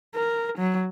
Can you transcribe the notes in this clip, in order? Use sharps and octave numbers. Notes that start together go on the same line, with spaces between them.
A#4
F#3